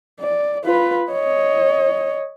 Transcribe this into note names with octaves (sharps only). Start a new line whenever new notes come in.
D5
F4 B4
C#5 D#5